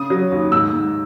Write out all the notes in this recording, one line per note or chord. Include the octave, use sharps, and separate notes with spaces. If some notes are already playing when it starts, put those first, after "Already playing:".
Already playing: C#3 D#6
F#3
D#2
G#2 E6
G#2